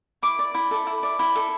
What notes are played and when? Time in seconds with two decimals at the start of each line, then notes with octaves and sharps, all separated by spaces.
0.22 E4 D6
0.39 D5
0.54 E4
0.71 A4
0.87 E4
1.03 D5
1.19 E4
1.36 A4